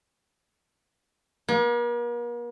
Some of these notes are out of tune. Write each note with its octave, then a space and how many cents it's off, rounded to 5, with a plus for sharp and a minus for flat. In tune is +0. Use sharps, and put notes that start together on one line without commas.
A#3 +45